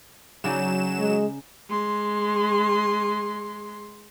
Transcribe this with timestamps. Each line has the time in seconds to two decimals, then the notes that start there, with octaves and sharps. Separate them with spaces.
0.44 C#3 F#3 D#4 D5 E7
0.99 G#3
1.69 G#3 C6